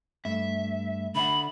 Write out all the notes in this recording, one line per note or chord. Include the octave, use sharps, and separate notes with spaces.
G2 A3 E5
D3 E5 F#5 B5